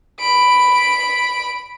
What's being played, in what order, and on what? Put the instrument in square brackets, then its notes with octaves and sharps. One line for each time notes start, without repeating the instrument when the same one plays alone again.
[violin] B5 D7